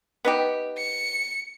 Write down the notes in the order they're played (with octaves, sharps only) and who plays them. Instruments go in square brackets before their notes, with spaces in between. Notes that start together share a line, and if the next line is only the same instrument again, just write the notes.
[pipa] B3 D#4 G4
[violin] C#7